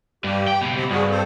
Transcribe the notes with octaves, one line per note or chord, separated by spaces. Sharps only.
G2 G4
G5
C#2 B2
C4 G4
G2 F#4 G#4
C4 A4 C5